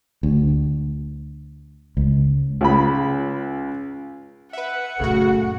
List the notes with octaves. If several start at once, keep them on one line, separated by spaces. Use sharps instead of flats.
D2
C#2
C#2 B5
B4 E5 F#5
F#2 A#2 C#3 A3 F#4